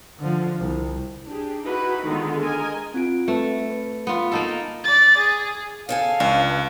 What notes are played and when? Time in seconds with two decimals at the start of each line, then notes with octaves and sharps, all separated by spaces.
0.19 D3 F3
0.59 C2
1.27 D4 G4 G#4
1.61 D#4 E4 F#4 G4 B4
2.05 D3 D#3 G#3 B3 D#4 F4
2.42 A#4 D#5 G#5
2.94 C4 F4 D7
3.28 A3 C4 B4
3.70 B4
4.07 B3 F4
4.32 A#3 D#4 A4
4.84 D5 A6
5.18 G#4
5.89 C#3 A4 F5 G#5
6.20 C#2 D4